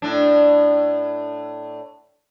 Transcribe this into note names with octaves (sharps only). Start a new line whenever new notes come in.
A2 D4